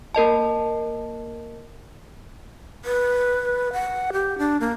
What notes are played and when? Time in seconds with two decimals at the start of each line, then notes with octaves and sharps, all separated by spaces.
0.15 A#3 A#4 D#5 A5
2.85 B4
3.73 F#5
4.13 G4
4.38 D4
4.60 A#3